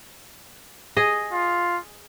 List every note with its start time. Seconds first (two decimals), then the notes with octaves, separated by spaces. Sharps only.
0.97 G#4 D#5
1.33 F4